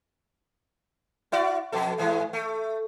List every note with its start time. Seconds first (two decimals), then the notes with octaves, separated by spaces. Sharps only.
1.32 E4 F#4 D5
1.72 F2 B2 A4
1.98 G#2 E3 G#3
2.33 A3